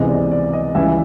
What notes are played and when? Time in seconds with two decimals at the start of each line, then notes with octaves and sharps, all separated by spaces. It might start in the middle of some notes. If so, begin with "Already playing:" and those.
Already playing: C#2 C3 E3 G#3 B3 D#5
0.08 D5
0.31 D5
0.53 D#5
0.75 C#2 C#3 E3 G3 E5